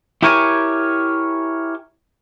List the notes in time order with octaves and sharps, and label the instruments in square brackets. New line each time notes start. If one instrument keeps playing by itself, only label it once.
[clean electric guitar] E4 G4 A#4 C#5 G#5